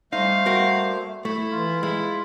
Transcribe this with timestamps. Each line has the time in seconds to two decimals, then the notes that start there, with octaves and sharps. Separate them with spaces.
0.13 G3 A3 D#4 C5 F5
0.46 A#3 F#4 A#4
1.25 A3 E4
1.51 E3 F4
1.83 G#3 E4